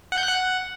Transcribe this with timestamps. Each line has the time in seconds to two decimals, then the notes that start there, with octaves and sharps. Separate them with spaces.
0.12 F#5
0.18 G6
0.23 F#6
0.29 F#5